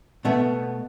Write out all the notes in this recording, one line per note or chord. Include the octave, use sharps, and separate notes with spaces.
B2 A3 B3 E5